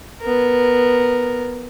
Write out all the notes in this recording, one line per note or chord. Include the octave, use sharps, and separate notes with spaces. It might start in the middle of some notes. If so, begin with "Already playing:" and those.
B3 A#4